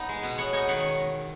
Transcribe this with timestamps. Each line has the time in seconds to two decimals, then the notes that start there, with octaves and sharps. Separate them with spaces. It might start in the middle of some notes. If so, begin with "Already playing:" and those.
Already playing: B3 D#4 B4 D#5
0.09 G#3
0.23 B2
0.38 B3 C#5 F#5
0.53 D#4 D#5 G#5
0.68 D#3 C#5 F#5